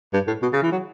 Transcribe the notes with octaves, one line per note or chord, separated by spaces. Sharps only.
G2
A2
B2
C#3
E3
F#3